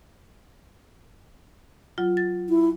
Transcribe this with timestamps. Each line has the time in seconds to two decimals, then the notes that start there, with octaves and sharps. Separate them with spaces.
1.98 F#3 F4
2.17 A6
2.49 E4